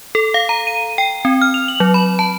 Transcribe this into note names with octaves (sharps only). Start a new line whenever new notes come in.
A4
F5
A#5
D#7
G5
C4
F6
F7
F#7
F#3
B5
A5